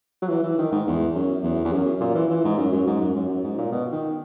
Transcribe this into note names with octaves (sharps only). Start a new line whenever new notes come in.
F#3
E3
E3
D#3
G#2
E2
F#2
E2
E2
F#2
A#2
E3
E3
G#2
F#2
F#2
G#2
F#2
F#2
F#2
G#2
A#2
B2
D#3